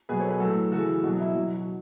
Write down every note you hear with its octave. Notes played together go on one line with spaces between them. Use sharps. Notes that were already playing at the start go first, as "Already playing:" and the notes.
B2 F#3 G#4 B4
A4 C#5
G#4 B4
A2 F#3 F#4 A4
C#3 E3 F#4 A4
B2 F#3 F#4
E4
B2 F#3
F#4
F#4